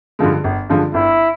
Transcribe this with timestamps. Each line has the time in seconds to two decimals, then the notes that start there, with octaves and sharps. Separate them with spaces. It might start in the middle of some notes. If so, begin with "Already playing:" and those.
0.19 G2 D3 F3 G#3
0.44 G1
0.70 G2 D3 F3 G#3
0.94 G1 E4